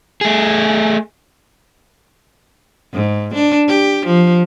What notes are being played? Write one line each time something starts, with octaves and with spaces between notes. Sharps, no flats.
A3 G#4
G#2
D4
G4
F3